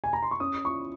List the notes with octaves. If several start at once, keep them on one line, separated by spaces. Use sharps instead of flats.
G#5
A#5
C6
C#6
C#4 D#6
F4 C#6